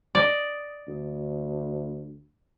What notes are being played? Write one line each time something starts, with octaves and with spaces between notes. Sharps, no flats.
D5 D#5
D2